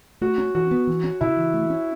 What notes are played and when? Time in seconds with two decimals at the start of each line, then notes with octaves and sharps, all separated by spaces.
0.21 A3 F#4
0.38 C#4
0.55 E3 F#4
0.71 B3
0.87 E3
1.04 C#4
1.21 C#3 E4
1.37 E3
1.54 A3
1.70 C#4